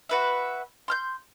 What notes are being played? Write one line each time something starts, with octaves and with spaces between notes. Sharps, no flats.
F#4 B4 E5
C6 F6 G6